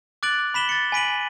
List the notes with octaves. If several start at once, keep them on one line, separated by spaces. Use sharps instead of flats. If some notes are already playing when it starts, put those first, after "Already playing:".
D6 F#6 A6 D7 F#7
B5 B6 E7 F#7 G7
A6 C#7
G#5 B5 B6 D7 D#7 F#7